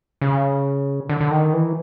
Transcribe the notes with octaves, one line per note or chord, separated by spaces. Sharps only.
C#3
D3
D3
D#3
E3